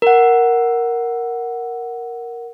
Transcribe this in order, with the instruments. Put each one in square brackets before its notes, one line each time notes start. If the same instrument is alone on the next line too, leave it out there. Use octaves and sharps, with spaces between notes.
[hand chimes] A#4 F#5